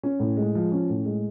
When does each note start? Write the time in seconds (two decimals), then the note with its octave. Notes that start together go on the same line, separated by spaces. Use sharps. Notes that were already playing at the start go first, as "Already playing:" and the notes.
0.03 C#4
0.20 A2
0.37 G#3
0.55 F3
0.72 C#4
0.90 A2
1.06 G#3